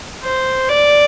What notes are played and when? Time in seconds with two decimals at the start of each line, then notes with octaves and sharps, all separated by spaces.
0.23 C5
0.69 D5